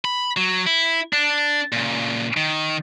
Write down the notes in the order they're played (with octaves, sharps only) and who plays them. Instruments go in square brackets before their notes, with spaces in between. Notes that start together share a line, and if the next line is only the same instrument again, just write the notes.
[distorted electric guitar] B5
F#3
E4
D4
A#2 C#3
D#3